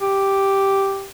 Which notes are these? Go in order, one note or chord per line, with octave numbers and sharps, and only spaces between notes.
G4